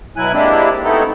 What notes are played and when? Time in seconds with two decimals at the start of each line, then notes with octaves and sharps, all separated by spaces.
0.17 B2 F#3 E4 G#5 F#6
0.33 G#3 A#3 C4 D4 E4 G4
0.84 A3 B3 C4 D#4 E4 A4